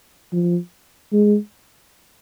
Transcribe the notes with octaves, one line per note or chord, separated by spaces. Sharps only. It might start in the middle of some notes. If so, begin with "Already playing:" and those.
F3
G#3